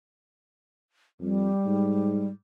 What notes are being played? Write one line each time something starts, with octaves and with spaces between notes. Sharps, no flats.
F2 G3
G#2